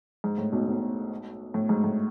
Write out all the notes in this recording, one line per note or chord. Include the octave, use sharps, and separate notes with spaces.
G#2
A2
B1 B2
B1 B2
A2
G#2
A2